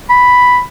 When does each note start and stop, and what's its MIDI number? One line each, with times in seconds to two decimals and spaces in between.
0.10 0.60 83